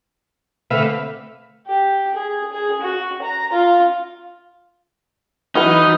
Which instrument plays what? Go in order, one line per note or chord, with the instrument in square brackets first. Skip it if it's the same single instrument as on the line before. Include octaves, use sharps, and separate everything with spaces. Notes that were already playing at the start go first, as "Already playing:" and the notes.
[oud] D3 A3 C4 [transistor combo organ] B4 E5 F5
[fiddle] G4
G#4
G#4
F#4
A#5
F4
[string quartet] E3 F#3 [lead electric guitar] D#4 [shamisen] E4 F#5 [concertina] B4 D#6 F6